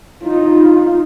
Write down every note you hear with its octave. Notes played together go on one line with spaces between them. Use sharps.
D#4 F4